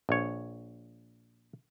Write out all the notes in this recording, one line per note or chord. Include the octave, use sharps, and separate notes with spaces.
A#1 C#5